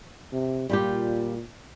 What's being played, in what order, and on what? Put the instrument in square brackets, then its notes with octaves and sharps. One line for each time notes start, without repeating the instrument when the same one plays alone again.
[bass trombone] C3
[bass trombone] A#2 [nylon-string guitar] G3 F4 G4